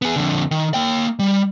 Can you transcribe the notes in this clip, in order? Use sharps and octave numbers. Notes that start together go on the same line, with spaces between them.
B3 G#4
F2 D3
D#3
A#3 G5
G3